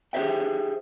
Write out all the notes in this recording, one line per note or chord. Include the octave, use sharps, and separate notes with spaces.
G4 G#4 B4 C5 E5 G5